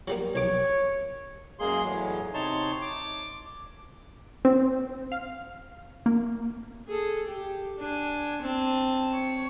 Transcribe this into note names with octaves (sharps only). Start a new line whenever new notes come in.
F#3 G3 A#3
B1 C#5 D6
F#2 G#3 A#3 G#4 C6
E2 A2 F#3 G#3
C3 D#4 C#5 A5 C6
D6
C4
F5
A#3
G#4 A4
G4
D4 G#5
C4 A5
C#5